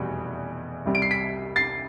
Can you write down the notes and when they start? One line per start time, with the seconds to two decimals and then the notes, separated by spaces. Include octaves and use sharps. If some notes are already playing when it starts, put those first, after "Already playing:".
Already playing: F1 E2 B2 G3
0.86 C2 C3 G3
0.95 D7
1.02 C7
1.11 B6 D7
1.56 A6 C7